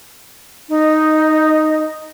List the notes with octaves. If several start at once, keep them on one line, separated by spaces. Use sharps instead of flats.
D#4